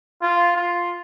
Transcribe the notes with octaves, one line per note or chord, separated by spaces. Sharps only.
F4
F4